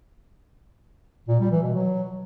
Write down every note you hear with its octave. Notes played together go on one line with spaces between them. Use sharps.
A#2
G3
E3
B2
F#3